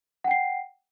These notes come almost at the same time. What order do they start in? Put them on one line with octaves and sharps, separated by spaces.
F#5 G5 C7